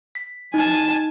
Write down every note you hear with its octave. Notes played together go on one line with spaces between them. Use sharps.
B6
D#4 G#5 A5